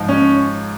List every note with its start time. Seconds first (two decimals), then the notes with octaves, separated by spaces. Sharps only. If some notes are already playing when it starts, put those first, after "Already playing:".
Already playing: G#2 F3
0.09 C#4